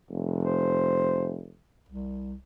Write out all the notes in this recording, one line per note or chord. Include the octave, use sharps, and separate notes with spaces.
F1
C5
C2